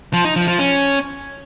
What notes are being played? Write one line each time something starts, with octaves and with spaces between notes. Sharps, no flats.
F3
D#4
F3
F3
C#4